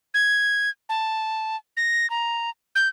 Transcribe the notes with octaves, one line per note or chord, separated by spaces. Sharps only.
G#6
A5
A#6
A#5
G6